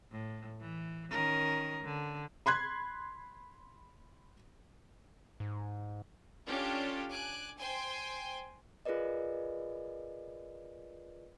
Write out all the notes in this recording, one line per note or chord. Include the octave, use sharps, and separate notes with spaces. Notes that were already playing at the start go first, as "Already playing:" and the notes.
A2
E3
D#3 C#4 A#4
D3
B5 C6 F#6 G#6
G#2
C#4 D4 F4 G4 A4
G#5 D6 F#6
C5 G5 G#5 C6
F4 G#4 A#4 B4 D5 D#5